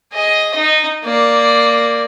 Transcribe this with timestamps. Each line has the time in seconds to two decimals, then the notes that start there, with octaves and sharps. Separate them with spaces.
0.12 G#4 D#5
0.56 D#4
1.05 A#3 D5